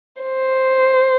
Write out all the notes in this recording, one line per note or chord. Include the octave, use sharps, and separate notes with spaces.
C5